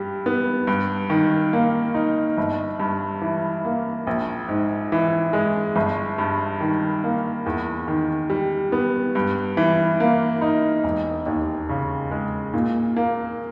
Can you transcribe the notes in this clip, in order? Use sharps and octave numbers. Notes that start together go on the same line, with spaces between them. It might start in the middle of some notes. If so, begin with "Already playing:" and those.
Already playing: G2 G3
B3
G2
D#3
A#3
D#4
G1
G2
E3
A#3
A#1
G#2
E3
G#3
G1
G2
D#3
A#3
E2
D#3
G3
B3
G2
E3
A#3
D#4
E1
D#2
C#3
G#3
A#2
A#3